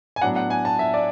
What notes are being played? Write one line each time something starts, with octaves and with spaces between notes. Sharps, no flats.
G#5
A2 F#3 B3 D4 F#5
F#5
G#5
A5
E5
D5